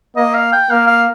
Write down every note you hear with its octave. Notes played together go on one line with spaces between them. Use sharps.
A#3 D#5
F5
G5
A#3 F5
F5